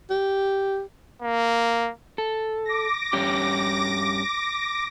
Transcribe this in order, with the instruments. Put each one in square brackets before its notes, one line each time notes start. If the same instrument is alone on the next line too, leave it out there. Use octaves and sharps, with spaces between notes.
[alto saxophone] G4
[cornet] A#3
[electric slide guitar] A4
[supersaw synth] D6 A#6
[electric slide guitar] G2 C#4 G4